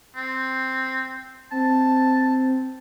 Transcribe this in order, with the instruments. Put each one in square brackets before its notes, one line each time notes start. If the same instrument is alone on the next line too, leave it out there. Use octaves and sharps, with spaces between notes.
[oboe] C4
[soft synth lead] C4 [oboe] A5